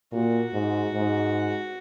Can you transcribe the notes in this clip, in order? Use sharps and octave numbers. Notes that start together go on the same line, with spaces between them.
A#2 F#4
G#2
G#2